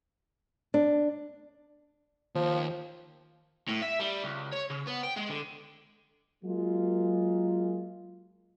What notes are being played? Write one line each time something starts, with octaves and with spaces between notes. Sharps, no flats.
D4
D#2 F3
A2
E5
G3
C#2
C#5
C#3
B3
G5
G#3
D3
F#3 G#3 A#3 F4